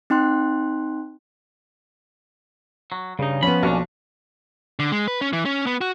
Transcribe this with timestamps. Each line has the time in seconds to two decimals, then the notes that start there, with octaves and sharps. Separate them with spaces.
0.10 C4 D#4 G5 C6 F#6
2.92 F#3
3.19 G2 C#3 D#4
3.43 F3 B3 C#4 B5
3.63 B1 A#3 C#4 D4
4.79 D3
4.92 G#3
5.08 B4
5.21 C#4
5.33 E3
5.45 C#4
5.67 B3
5.81 F#4